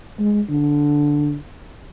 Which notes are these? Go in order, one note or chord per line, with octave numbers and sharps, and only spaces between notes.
G#3
D3